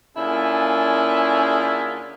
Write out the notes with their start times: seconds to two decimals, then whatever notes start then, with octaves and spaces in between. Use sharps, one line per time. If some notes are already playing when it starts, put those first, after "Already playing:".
0.16 D3 A#3 C#4 E4 F4 G#4